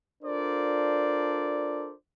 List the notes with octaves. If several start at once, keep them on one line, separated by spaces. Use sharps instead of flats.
D4 F4 A4 A#4 C5 D5